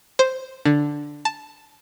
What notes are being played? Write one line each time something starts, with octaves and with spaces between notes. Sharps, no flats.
C5
D3
A5